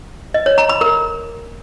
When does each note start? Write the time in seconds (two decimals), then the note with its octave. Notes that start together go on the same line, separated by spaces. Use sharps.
0.34 D#5
0.46 C#5
0.58 A#5
0.69 B5
0.81 A#4